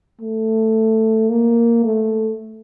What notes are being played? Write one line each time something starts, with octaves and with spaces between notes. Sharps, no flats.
A3
A#3
A3